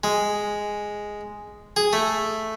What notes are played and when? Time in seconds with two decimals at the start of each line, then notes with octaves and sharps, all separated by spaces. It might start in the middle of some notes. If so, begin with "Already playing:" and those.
0.04 G#3
1.76 G#4
1.93 A3